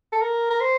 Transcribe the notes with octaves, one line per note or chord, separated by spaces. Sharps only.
A4
A#4
A#4
C5